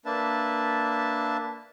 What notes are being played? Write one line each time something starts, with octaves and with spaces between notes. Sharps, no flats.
A#3 D4 B4 E5 A5